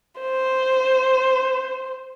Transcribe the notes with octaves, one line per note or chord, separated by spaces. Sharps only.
C5